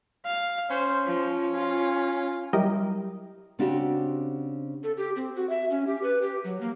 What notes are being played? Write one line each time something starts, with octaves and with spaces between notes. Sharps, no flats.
F5
C#4 C5
F3
F4
F#3 G3 E4 G4 A#4 D#5
C#3 C4 D4 F#4 G4
A4
G4
C4
F#4
E5
C#4
G4
B4
G4
F#3
A#3